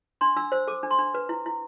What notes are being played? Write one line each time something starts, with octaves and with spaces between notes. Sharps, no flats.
D4 C6
D4 E6
C5 E6
A4 D6
D4
C6
D4
B4
E4
E4